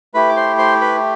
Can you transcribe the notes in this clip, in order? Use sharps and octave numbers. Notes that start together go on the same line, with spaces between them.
A3 E4 G4 B4 B5
D6
C5 C6
C5 C6
B4 B5